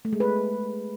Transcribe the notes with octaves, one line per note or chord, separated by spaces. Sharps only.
A3
G#3
B4